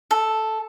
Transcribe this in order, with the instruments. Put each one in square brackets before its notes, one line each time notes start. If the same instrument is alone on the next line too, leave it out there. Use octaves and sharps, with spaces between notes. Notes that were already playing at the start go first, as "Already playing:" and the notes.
[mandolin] A4